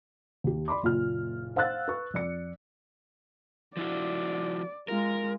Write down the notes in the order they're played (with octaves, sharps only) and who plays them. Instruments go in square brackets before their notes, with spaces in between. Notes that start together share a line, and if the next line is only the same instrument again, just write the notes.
[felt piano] D#2 G4
D5 B5 C6 D6
F#1 A#2 F4 F6
C5 F5 F#5 E6 F#6 A6
B4 C#6
F2 D5 C#7
[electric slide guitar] F3 E4 F#4 [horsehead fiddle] D5
[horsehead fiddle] G#3 F4 [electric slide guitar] A#4